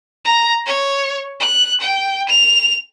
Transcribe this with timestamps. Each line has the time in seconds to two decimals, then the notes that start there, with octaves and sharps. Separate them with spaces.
0.25 A#5
0.66 C#5
1.40 F#6
1.80 G5
2.29 F7